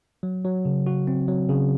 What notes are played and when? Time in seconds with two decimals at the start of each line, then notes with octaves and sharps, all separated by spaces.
0.23 F#3
0.45 F#3
0.65 C#3
0.86 F#4
1.07 C4
1.28 F#3
1.49 C#3